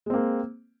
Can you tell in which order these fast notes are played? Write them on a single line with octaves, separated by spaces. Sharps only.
G#3 C4 A#3